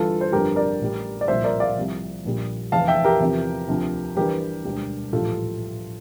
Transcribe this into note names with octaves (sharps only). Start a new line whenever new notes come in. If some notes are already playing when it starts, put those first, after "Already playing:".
Already playing: G1 G2 E3 F4 A4
C5
G1 F2 D3 G4 A#4
A#4 D5
A1 A2 G3
D5
C2 A#2 F3 C5 E5
A#4 D5
D5 F5
C2 C3 F3
A#1 A#2 G3
F1 E2 E3 F5 A5
E5 G5
G4 A#4
E2 C3 F3
D2 C3 F3
G1 G2 E3 G3 G4 A#4
E1 D2 D3 G3
A#1 A2 E3 G3 F4 A4